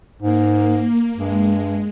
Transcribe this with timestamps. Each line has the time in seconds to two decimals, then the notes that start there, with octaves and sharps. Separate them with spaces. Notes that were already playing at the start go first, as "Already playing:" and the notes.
0.22 G#2 A#3
1.16 G2 G#3